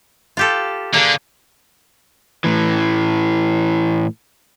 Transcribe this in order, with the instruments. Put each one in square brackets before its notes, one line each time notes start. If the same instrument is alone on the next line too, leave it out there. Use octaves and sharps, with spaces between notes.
[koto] F4 G4 A4
[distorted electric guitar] D3 [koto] A#3 G#4
[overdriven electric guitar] A2 E3